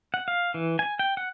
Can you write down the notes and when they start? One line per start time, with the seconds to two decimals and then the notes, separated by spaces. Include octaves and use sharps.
0.14 F#5
0.28 F5
0.54 E3
0.79 G#5
0.99 G5
1.17 F#5